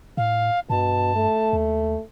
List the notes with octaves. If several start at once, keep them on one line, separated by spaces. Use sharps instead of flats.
A2 F5
G2 B2 A5
A3
D#2